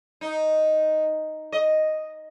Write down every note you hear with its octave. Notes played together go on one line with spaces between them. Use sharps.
D#4
D#5